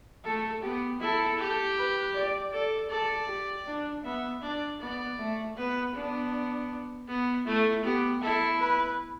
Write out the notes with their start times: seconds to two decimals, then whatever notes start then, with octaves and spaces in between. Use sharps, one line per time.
0.25 A3 A4
0.63 B3 G4
1.00 E4 A4
1.38 G4
1.77 B4
2.14 D5
2.52 A4 D5
2.90 A4 D5
3.28 G4
3.66 D4
4.04 B3 E5
4.42 D4 D5
4.80 B3 D5
5.18 A3
5.57 B3 B4
5.95 B3 D4
7.07 B3
7.46 A3 E4
7.83 B3 G4
8.22 E4 A4
8.60 B4